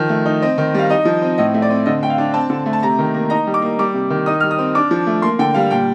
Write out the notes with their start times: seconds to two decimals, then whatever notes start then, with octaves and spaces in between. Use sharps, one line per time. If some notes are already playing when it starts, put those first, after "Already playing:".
Already playing: D#3 F3
0.09 A3
0.26 D#4
0.42 C4 D#5
0.58 D#3
0.74 G3 F5
0.89 D#4 D#5
1.05 F3
1.22 C4
1.38 A2 D#5
1.54 A3
1.62 D5
1.70 C4
1.86 D3 D#5
2.02 A3 G5
2.10 F5
2.18 D4
2.34 C4 A5
2.50 D3
2.66 A3
2.73 A5
2.82 C3 A#5
2.99 D#3
3.14 A#3
3.30 D#4 A#5
3.47 G3
3.54 D6
3.62 A#3
3.79 G3 D6
3.94 C3
4.10 D#3
4.26 D#4 D#6
4.40 G3 F6
4.51 D#6
4.59 C4
4.75 D4 D6
4.91 F3
5.07 A3
5.22 A#3 C6
5.39 D3 G5
5.54 G3 F5
5.71 A#2 G5